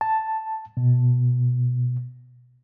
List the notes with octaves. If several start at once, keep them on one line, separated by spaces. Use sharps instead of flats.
A5
B2